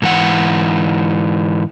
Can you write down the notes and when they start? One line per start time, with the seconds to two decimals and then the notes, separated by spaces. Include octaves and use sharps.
0.02 G#2 E3 F#5